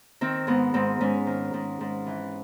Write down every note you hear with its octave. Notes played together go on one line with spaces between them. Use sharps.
D#3 C4
G#2 B3
G#2 C4
G#2 C#4
D#3
G#2
G#2
E3